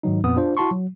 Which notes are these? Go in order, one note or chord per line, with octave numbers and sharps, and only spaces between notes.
G#2 D#3 F#3 D#4
F2 A#2 B3 D#6
D4 F4 C5
E4 F#4 A5 C6 C#6
F#3